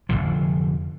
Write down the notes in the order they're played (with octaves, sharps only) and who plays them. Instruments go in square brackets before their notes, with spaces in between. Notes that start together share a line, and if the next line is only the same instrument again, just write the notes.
[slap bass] F1 D#2 D3 F3